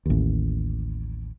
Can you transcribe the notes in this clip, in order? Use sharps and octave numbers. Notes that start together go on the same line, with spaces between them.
A1 D#2